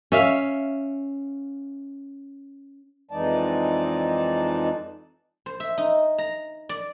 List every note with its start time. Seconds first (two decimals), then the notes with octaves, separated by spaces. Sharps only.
0.12 C#4 E5 F5
3.11 F2 E3 G#3 D#4 D5 A5
5.46 C5
5.60 E5
5.78 D#4
6.18 A#5
6.69 D5